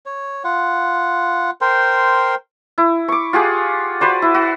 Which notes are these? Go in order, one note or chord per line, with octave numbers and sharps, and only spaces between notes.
C#5
F4 F#5
A#4 C5 G5 C6
E4
C#6 D6
F4 G4 G#4 F#5
F#4 B4 C5 D5
E4
F#4